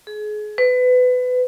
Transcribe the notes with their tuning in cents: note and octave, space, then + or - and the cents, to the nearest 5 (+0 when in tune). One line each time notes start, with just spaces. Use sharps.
G#4 +30
B4 +25